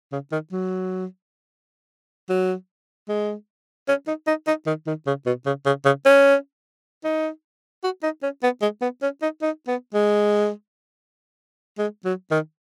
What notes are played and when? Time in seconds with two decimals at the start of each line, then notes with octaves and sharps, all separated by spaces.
0.12 C#3
0.32 D#3
0.52 F#3
2.29 F#3
3.09 G#3
3.88 C#4
4.07 D#4
4.27 D#4
4.47 D#4
4.67 D#3
4.87 D#3
5.07 C#3
5.26 B2
5.46 C#3
5.66 C#3
5.85 C#3
6.05 C#4
7.04 D#4
7.84 F#4
8.03 D#4
8.23 C#4
8.43 B3
8.62 G#3
8.82 B3
9.02 C#4
9.22 D#4
9.42 D#4
9.68 B3
9.94 G#3
11.78 G#3
12.05 F#3
12.31 D#3